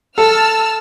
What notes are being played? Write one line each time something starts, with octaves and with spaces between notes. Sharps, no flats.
A4 A5 E6 F6